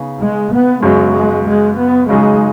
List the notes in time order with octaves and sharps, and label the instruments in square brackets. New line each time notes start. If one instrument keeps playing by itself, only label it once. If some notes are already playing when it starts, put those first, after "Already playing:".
Already playing: [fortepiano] C#3 B3 D#4 G#4
[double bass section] G#3
B3
[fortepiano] F#2 C#3 F#3 B3 F#4 [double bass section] G#3
[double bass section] G#3
G#3
B3
[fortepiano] C#3 F#3 D#4 G#4 [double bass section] G#3